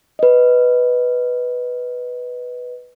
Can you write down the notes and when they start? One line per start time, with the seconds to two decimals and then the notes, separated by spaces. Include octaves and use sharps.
0.19 B4 D#5